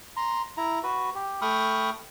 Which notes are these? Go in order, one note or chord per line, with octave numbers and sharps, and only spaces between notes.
A#5 C6
E4 A#5
F#4 B4
G4
A3 G5 B5 C#6 D#6 F6